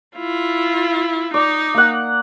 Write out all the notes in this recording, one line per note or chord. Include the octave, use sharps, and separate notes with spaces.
E4 F4
D#4 D5
A#3 F#5